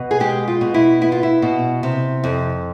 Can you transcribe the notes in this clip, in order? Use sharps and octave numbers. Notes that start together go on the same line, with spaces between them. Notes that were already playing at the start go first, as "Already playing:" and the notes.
Already playing: B2
G#4
G#3 G4
F4
B2
E4
B3 E4
F4
E4
B2
C3
F2